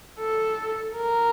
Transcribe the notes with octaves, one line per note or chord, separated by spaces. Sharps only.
A4
A#4